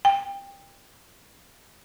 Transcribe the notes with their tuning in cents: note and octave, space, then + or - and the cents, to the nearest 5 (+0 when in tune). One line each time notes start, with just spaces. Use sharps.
G5 +20